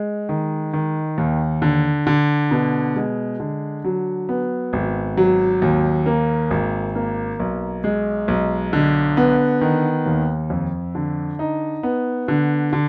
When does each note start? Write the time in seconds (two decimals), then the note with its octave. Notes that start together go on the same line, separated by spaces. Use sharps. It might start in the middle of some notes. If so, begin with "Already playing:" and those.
Already playing: G#3
0.29 D#3
0.73 D#3
1.18 D#2
1.62 D3
2.07 D3
2.51 B2
2.96 G#3
3.40 D3
3.85 F#3
4.29 B3
4.73 G#1
5.17 F#3
5.62 D#2
6.06 A#3
6.51 G#1
6.95 A#3
7.40 B1
7.84 G#3
8.28 B1
8.73 D3
9.17 B3
9.61 D#3
10.06 D#2
10.50 F2
10.95 D3
11.39 D#4
11.83 B3
12.28 D3
12.73 D3